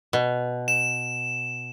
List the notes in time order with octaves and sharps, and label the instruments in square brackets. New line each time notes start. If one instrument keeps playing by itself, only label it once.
[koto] B2
[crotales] E7